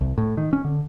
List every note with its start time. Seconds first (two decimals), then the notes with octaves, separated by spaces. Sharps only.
0.01 C2
0.18 A2
0.37 D#3
0.53 C#4
0.65 D3